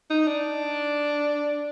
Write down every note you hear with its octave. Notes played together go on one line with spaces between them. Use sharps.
D#4
D4